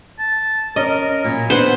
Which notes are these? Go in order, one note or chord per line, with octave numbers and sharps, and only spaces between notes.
A5
C#4 A#4 D#5
A#2 F#3 E4
B3 D4 C5 F#5 B5